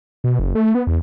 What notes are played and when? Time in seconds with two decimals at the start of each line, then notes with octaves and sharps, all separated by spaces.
0.24 B2
0.39 F#1
0.55 A3
0.75 B3
0.87 E2